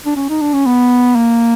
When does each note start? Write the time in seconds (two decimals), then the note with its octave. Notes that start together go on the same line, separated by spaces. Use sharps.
0.06 D4
0.16 C#4
0.29 D#4
0.41 D4
0.54 C#4
0.66 B3
1.15 A#3